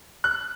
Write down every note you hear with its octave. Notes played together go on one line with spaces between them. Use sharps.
F#6